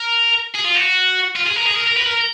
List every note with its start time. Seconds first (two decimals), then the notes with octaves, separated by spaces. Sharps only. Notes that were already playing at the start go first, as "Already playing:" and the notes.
Already playing: A#4
0.54 G#4
0.64 F4
0.75 F#4
1.36 F4
1.47 G#4
1.56 A#4
1.67 G#4
1.77 A#4
1.87 A#4
1.97 B4
2.07 A#4